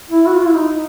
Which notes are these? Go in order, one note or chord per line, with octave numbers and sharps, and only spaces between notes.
E4
F#4
F4
E4
D#4